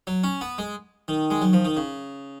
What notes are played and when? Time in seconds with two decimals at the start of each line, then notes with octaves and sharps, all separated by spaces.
0.07 F#3
0.24 C#4
0.41 B3
0.58 G#3
1.08 D#3
1.30 G#3
1.41 F#3
1.53 F3
1.65 D#3
1.77 C#3